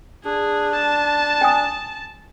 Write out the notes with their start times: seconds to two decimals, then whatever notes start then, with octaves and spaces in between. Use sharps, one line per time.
0.25 D4 G#4
0.75 A5
1.41 G5 G#5 D#6